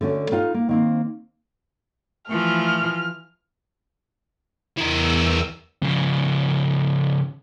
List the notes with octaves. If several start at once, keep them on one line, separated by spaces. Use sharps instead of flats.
D3 A3 C#4 F#4
D#4 F4 F5
A#3
D#3 A#3 C4
E3 F3 A3 F6
E2 E3 A#4 E6
C#3 F3